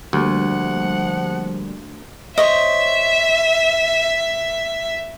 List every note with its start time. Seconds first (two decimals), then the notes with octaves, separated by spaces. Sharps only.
0.13 D2 D3 F3 G3 A#3 F#5
2.38 C5 C#5 D#5 E5